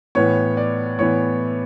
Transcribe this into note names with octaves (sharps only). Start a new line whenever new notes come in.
A2 E3 B3 C#5
D5
A2 E3 B3 C#5